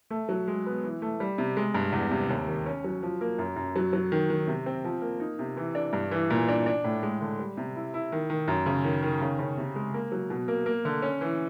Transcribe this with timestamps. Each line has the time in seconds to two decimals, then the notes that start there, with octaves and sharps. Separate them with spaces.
0.10 A3
0.29 F#3
0.48 G#3
0.66 B3
0.84 E3
1.02 A3
1.20 G3
1.38 C3
1.57 G#3
1.74 G2
1.92 E2
2.11 C3
2.29 D#2
2.47 D#3
2.66 C#4
2.84 F#3
3.03 F3
3.21 A#3
3.39 F#2
3.56 F#2
3.76 F#3
3.93 F#3
4.12 D#3
4.30 D#3
4.47 C3
4.66 C4
4.84 F3
5.02 A#3
5.20 D#4
5.39 C3
5.57 E3
5.75 D4
5.93 G2
6.11 E3
6.30 A#2
6.49 D4
6.66 D4
6.84 A2
7.03 G#3
7.21 D3
7.39 G3
7.57 C3
7.76 E4
7.94 E4
8.12 D#3
8.30 D#3
8.48 F#2
8.66 C#3
8.84 D#3
9.03 D#3
9.21 C#3
9.39 C#3
9.57 C3
9.76 G#3
9.94 A#3
10.12 F#3
10.30 B2
10.48 A#3
10.66 A#3
10.85 D3
11.02 C#4
11.21 E3